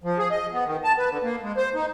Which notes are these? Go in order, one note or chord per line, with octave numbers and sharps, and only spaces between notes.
F3
G#4
D#5
B3
D#3
A5
B4
D3
A#3
G#3
C5
D#4